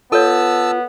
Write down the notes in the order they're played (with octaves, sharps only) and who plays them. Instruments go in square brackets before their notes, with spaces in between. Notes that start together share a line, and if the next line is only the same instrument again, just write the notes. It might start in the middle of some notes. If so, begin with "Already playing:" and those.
[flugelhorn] B3 [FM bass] F4 [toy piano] A4 C#5 [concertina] A5 E6